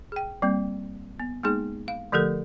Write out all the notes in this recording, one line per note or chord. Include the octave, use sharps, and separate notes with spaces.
G#4 G5
G3 A#3 C4
B3
G#3 A#3 B3 D#4 G#4
F5
D3 F3 A3 G4 A4 A#4